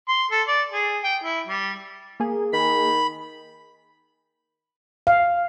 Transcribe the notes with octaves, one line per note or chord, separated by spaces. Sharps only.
C6
A4
D5
G#4
G5
E4
G3
A#3 G#4
D#3 B5
F5